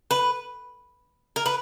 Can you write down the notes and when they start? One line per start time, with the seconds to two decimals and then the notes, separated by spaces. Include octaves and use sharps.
0.11 B4
1.36 A#4
1.46 B4